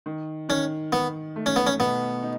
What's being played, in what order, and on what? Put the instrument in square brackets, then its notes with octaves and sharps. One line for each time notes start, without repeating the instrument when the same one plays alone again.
[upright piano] D#3
[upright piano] D#3 [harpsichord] C#4
[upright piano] D#3 [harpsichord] B3
[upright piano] A3
[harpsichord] C#4
B3
C#4
[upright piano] B2 [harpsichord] B3
[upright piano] D#4